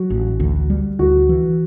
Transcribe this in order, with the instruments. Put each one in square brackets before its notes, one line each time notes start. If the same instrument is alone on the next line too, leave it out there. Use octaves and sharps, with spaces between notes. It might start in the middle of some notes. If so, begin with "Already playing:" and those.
Already playing: [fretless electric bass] F#3 [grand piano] F#4
[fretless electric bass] A1
D2
G3
[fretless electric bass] D2 [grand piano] F#4
[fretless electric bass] E3